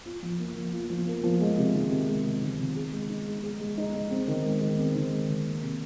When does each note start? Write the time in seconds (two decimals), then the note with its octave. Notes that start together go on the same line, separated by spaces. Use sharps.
0.06 F4
0.22 F3
0.40 A#3
0.56 F3
0.73 F4
0.90 F3
1.07 A#3
1.23 F3
1.41 G#3
1.58 C3
1.74 D#3
1.91 C3
2.08 G#3
2.25 C3
2.42 D#3
2.59 C3
2.76 G#4
2.92 G#3
3.09 D#4
3.26 G#3
3.43 G#4
3.60 G#3
3.78 D#4
3.94 G#3
4.11 C4
4.28 D#3
4.45 G#3
4.61 D#3
4.78 C4
4.95 D#3
5.12 G#3
5.29 D#3
5.46 A#3
5.63 C3